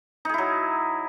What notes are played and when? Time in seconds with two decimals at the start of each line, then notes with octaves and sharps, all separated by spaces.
0.25 D#4
0.29 G#4
0.34 E4
0.38 F#3